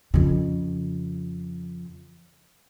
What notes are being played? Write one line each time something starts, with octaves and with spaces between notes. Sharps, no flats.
F2 C#3